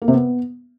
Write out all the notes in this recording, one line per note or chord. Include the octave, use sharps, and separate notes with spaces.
A#3
C3
B3